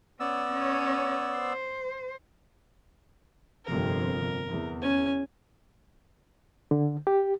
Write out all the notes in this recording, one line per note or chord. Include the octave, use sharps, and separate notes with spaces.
B3 C#4 D5 E6
C#4 C#5
C5
G1 F2 C3 A#4
E2
C#4 G#5
D3
G4